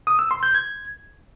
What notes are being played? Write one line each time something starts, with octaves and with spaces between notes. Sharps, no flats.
D#6
E6
C6
G6
G#6